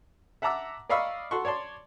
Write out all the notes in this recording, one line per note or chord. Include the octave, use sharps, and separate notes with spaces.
E5 F#5 A5 A#5 D6 E6
D5 D#5 F5 B5 C#6 E6
F#4 A4 F#5 C6 C#6
C#5 D5 A5 C6